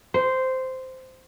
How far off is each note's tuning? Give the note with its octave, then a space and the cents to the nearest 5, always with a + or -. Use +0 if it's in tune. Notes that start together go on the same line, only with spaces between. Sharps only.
C5 -10